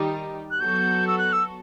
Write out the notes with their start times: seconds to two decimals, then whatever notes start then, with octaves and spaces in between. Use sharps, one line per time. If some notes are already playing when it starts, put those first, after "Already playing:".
Already playing: D#3 G3 D#4 G4
0.51 F#6
0.60 F#3 B3 F#4 A4 G6
1.07 E6
1.18 F#6
1.33 E6